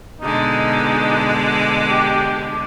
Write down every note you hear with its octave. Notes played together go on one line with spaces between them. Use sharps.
B2 D3 G#3 D#4
G4